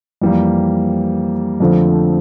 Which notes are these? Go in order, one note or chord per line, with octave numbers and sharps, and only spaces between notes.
F2 E3 G3 A#3
F2 D3 F3 A3 C4